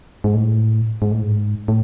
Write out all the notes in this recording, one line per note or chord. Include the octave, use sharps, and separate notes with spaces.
G#2
A2
G#2
A2
G#2
A2